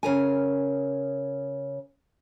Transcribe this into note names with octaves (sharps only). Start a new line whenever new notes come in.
C#3 A#4 G#5